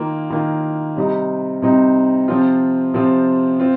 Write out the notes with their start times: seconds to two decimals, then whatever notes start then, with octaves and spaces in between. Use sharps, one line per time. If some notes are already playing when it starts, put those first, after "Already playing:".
Already playing: D#3 A#3 F4
0.30 D#3 A#3 F4
0.97 C3 G3 C4 D#4
1.62 C3 G3 C4 D#4
2.28 C3 F3 C4 F4
2.94 C3 F3 C4 F4
3.60 C4 F4